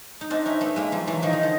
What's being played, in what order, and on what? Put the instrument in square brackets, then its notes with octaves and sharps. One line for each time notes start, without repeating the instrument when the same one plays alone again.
[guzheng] D#4
[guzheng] C4 D4 [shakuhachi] D#5
[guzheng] C#4 D#4 [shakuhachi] E5
[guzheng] A3 B3
G#3 A#3
F3 G3
E3 F#3
[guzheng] D#3 F3 [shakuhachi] D#5
[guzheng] D#3
[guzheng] D3 [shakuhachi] D#5